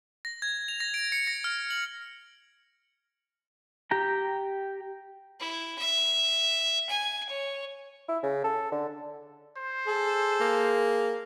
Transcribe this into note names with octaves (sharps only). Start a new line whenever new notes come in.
A#6
G#6
F7
A#6
D7
C#7
A#6
F6
F#7
G4 G5 A#5
E4
E5
G#5
C#5
E4
C#3
A4
D3
C5
G#4 A4
A#3